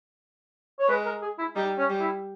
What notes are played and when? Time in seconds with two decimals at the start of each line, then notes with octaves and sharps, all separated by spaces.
0.79 C#5
0.88 G#3 B4
1.06 A#4
1.22 G#4
1.39 E4
1.56 G3 D#4
1.78 C#4
1.89 G3
2.01 E4